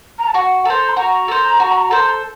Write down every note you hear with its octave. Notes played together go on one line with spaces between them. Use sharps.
A#5
A5
F#4 F#5
A4 C5 A#5
C6
F#4 A#5
A4 C5
F#4
A4 C5